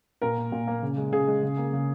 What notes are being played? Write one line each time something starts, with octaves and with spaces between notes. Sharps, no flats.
A#2 A#4
A#3
A#2
A#3
C#3
G#3
C#3 G#4
G#3
C#3
A#3
C#3